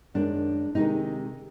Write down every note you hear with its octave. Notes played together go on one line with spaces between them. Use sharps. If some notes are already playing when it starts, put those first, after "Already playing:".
F#2 D#3 G#3 D4
C3 D#3 G#3 D#4